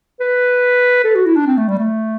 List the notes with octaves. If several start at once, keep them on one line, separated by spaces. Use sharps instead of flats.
B4
A4
F#4
E4
D4
C4
A3
G3
A3